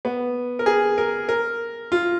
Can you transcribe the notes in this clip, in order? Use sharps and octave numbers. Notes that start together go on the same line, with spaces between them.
B3
A#4
G#4
A#4
A#4
F4